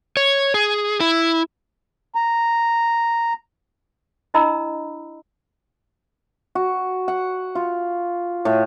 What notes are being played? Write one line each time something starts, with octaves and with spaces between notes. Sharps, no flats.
C#5
G#4
E4
A#5
D4 E4 D#5 A#5 B5 E6
F#4
F#5
F4
A2